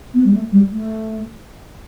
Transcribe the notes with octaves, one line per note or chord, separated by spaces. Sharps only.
B3
G3
A3
G3
A3